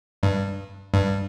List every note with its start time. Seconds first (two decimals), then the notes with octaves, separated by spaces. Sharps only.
0.23 G2
0.93 G2